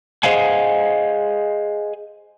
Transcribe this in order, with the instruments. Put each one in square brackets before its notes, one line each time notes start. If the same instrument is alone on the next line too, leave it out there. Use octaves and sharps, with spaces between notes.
[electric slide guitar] G#4 C5 D#5 F5 F#5 G#5